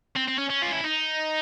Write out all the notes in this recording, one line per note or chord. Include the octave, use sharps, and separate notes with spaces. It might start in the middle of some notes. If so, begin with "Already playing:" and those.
C4
C4
C#4
C#4
F4
E4
D#4